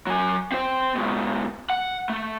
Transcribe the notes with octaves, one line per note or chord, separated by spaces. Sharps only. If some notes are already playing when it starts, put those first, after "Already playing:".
F#3 G#5
C4 C5
G#2 B2
F#5
A3